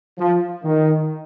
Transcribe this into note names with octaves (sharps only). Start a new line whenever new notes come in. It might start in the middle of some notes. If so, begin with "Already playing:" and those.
F3
D#3